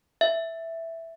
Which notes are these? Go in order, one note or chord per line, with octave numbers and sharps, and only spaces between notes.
E5